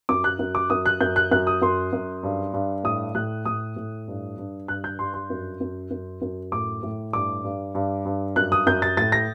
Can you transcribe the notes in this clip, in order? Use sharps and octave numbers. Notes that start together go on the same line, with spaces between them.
F#2 D6
F#6
F#2
D6
F#2 D#6
F#6
F#2 G6
F#6
F#2 F#6
D#6
F#2 C6
F#2
G2
G2
A2 D#6
A2 F#6
A2 D#6
A2
G2
G2
G2 F#6
G6
G2 C6
C6
F#2
F#2
F#2
F#2
A2 D6
A2
G2 D6
G2
G2
G2
F#2 F#6
D#6
F#2 G6
A6
A2 A6
A#6